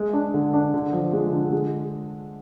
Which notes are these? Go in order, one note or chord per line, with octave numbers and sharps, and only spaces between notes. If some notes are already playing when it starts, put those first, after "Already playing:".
Already playing: G#3
D4
D3
D4
D3
F3
G#3
D3
G#3